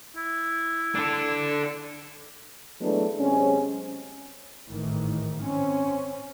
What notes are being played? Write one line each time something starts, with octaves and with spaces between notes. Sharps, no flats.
E4
D4 A4
E3 F#3 G#3 A3 B3 D4
C3 F#3 G#3 C4 C#4
G#1 A2 D#3 E3
C4 C#4